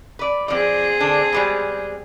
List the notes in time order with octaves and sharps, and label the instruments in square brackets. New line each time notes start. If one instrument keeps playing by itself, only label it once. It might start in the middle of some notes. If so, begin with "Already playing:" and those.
[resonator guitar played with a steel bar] B4 D5
[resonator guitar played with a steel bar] F3 D5 [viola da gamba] C4 G#4
[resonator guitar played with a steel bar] D3 D4
G3 G#3 B3